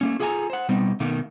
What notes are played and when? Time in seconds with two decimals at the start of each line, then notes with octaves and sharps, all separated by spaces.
0.01 A3 A#3 C#4
0.20 F4 G#4 A4 F#5 G#5 A#5
0.50 C5 F#5
0.69 B2 G3 B3 C4 D#4
1.00 B2 D#3 A3 A#3